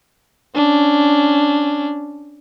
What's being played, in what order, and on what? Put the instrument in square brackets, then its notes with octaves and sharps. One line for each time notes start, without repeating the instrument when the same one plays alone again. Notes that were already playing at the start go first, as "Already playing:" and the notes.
[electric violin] C#4 D4